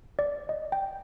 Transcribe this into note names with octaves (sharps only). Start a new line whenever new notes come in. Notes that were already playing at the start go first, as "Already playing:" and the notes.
D5
D#5
G5